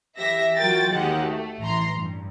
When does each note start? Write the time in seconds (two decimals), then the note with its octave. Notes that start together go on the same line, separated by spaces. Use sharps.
0.18 E3 G4 E5 A#6
0.57 F#3 F4 F#4 A#4 G5 A6
0.92 D#2 D#3 G#3 F#4 G4 F#5
1.24 A3
1.61 A1 E3 A#5 C6
1.97 G2